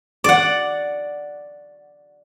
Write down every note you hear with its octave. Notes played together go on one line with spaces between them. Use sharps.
D5 F#5